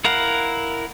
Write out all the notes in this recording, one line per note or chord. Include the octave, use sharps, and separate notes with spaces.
E4 A#4 F5 F#5